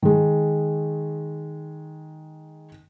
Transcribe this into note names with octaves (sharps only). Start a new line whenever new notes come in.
D#3 G#3